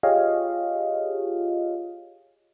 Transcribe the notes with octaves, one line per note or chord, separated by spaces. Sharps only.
F4 G4 G#4 C#5 D#5 F5